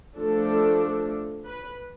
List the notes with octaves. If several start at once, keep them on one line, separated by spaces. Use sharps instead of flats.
F3 A3 D4 A4
B4